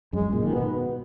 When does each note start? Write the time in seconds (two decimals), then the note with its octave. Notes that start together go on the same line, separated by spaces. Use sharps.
0.13 F#2 G#3
0.33 A#2
0.43 D#3
0.52 B2 B3